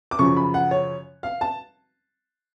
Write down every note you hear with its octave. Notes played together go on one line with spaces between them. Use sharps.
D6
F#2 C#3 F3 C#6
B5
F#5
C#5
F5
A5